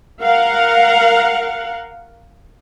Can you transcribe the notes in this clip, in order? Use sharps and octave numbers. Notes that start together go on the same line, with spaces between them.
A#4 F5 F#5